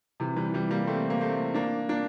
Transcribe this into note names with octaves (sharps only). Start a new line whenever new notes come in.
C3 E3
E3 G3
E3 G3
G3 A#3
A3 C4
A#3
A3 C4
A#3 D4
A#3 D4